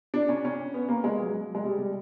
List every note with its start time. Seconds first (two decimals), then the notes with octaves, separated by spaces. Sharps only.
0.14 D4
0.29 C#4
0.45 C#4
0.74 B3
0.88 A#3
1.04 G#3
1.20 F#3
1.55 G#3
1.64 G3
1.78 G3